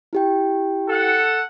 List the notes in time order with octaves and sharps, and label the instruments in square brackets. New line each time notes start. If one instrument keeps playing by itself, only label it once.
[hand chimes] E4 G4 G5
[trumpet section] A4 F#5